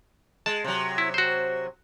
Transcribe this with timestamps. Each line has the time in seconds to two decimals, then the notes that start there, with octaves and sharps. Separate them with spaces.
0.46 G#3 A5
0.64 C3 F#3
0.98 E4
1.14 F#4 C5